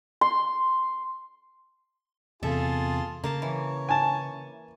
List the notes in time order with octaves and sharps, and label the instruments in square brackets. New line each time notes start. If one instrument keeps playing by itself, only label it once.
[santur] C6
[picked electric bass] E2 C3 [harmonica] F4 G#4 A5 [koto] A4 E5
[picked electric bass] C#3 [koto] A#3 F5 A5
[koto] E3 [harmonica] C#5
[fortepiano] G#5 A5